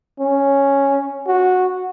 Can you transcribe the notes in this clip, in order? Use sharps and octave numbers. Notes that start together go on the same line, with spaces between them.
C#4
F#4